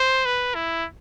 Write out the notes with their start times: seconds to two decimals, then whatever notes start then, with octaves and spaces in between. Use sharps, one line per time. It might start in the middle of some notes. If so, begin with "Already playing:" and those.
Already playing: C5
0.25 B4
0.55 E4